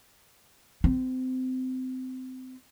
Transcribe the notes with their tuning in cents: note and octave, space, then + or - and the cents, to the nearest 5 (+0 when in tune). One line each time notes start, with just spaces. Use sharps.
C4 -25